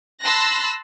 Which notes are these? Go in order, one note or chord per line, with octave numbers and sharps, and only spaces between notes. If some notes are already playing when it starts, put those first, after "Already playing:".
A5 B5 C6 E6 F#6 A#6